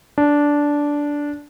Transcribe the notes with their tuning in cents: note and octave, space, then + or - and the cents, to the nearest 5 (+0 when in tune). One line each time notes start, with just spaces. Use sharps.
D4 -10